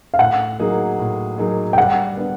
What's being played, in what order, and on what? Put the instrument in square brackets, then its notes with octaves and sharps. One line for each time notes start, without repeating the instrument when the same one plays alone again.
[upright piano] F5
[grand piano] A2 [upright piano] F#5
[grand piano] F#3 A#3 D#4 G#4
A2
F#3 A#3 D#4 G#4
[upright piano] G5
[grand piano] G3 [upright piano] F#5
[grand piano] B3 D4